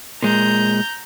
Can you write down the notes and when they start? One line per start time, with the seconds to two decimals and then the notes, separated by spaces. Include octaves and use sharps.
0.22 A#2 G#3 A#5 G6